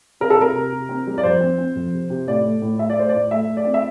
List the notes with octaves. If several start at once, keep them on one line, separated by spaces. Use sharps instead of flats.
C3 A#4
A4
C3 A#4
C3
C3
C4
G3
D5
F2 C5
C4
C4
F2
C3
C3
A2 D5
A3
A2
A3 E5
D5
A3 C5
A2 D5
A3 E5
A3
D5
C4
E5